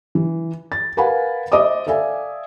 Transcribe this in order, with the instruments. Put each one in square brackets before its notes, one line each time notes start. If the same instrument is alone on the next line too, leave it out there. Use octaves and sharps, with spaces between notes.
[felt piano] E3
A6
A#4 B4 F5 F#5 G#5 B5
C5 D#5 E5 D6 D#6
A4 D5 E5 F5 G#5